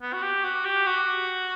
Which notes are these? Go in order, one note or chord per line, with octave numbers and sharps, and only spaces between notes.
B3
F#4
G4
F#4
G4
F#4